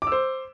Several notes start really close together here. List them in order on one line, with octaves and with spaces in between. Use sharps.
D6 E6 C5